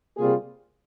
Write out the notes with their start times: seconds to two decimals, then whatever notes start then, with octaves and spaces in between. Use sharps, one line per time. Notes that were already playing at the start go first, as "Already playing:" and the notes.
0.17 C3 G3 A#3 F4 G#4